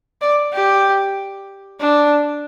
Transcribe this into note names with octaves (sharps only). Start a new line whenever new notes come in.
D5
G4
D4